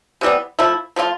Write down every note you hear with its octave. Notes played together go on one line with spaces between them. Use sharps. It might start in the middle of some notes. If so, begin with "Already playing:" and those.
C3 E3 G3 B3
F3 A3 E4
F3 A3 D4 F4